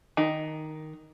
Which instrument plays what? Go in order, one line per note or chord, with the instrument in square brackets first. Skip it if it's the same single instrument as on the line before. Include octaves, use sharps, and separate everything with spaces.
[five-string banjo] D#3